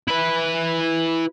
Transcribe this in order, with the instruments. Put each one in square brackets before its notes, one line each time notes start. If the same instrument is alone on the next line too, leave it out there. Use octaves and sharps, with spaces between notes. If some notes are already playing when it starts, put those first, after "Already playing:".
[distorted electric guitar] E4 B4